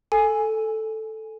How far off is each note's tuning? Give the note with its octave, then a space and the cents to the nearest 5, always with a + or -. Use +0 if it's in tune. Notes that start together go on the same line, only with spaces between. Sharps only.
A4 +0 G#5 +0